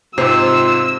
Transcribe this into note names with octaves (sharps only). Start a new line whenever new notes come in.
G#2 C3 F4 C5 E6